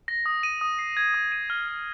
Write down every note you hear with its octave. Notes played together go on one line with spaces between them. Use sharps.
A#6
D#6
D#7
D#6
C7
G#6
D#6
D#7
F6
F6